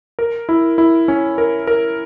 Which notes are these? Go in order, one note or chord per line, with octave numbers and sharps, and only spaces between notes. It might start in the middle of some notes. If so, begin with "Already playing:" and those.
A#4
E4
E4
C#4
A#4
A#4